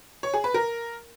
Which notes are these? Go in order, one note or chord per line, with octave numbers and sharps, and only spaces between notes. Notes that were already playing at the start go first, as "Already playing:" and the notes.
C#5
G#4
B4
A#4